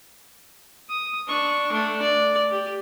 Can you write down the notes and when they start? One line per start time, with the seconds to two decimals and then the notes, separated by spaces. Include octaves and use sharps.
0.89 D#6
1.28 D4 C#6
1.72 A3 D4
2.02 D5
2.51 G4